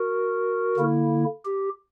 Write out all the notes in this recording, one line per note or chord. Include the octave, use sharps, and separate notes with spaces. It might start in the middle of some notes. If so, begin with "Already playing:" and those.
Already playing: F#4 A#4
D3 A#3 E4
G4